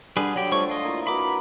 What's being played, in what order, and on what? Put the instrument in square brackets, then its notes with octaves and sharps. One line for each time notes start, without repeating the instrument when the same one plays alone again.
[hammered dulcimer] D3 [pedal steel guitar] G3 G#4 B4
[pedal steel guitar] F#3 G4
[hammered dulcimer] F3 A3 A4 [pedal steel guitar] G3 C#5 C#6
[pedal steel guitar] F4 D#5
[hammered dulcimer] A#3 E4
[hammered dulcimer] A#3 F#4 B4 [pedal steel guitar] B5 D6